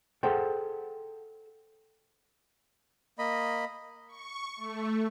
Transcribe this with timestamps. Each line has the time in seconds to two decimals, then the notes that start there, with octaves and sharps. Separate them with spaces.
0.23 G#4 A4 C5 F#5 G5
3.19 A#3 D#5 B5
4.08 C#6
4.57 A3